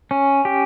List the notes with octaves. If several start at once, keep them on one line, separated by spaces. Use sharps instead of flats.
C#4
G4